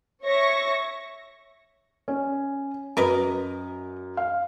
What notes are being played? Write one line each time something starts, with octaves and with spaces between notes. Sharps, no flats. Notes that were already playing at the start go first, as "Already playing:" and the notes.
C#5 E5 C#6 A#6
C#4
F#2 A#4 B4 D#5
F5